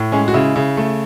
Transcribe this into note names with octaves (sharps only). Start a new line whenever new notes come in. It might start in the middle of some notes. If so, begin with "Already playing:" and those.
Already playing: A2
G#3 C#4
F#4
C#3 E4
C#3
A3